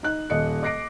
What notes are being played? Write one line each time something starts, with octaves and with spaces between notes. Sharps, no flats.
D#4 F#6
D#1 D#5 C#7
D#5 D6 F#6 A#6 C7 D7